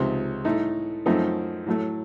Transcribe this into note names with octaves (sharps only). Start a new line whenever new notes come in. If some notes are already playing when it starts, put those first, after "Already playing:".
Already playing: C#2 C3 F3 C4 D#4
A2 A3 D#4
F#2 F3 A3 C4 D#4
A2 F#3 A3